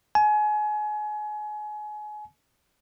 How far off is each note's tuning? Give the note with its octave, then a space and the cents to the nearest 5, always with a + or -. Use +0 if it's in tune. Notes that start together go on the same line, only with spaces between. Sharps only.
G#5 +30